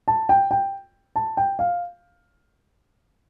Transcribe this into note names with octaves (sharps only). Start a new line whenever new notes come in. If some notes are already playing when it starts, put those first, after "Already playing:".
A5
G5
G5
A5
G5
F5